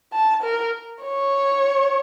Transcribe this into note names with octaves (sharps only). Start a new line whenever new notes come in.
A5
A#4
C#5